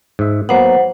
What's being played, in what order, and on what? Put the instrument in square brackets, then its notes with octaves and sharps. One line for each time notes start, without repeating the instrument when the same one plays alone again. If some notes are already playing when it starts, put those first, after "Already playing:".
[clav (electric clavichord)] G#2 E5
[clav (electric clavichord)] F#3 A#3 B3 [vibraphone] C5 F#5